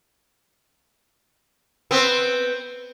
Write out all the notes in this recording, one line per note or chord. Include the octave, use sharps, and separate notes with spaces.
B3 C4